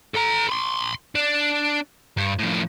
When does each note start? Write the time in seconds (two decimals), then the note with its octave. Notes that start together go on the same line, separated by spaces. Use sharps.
0.15 A4 A#5
0.50 B5 C6
1.15 D4
2.17 G2
2.39 A2 F3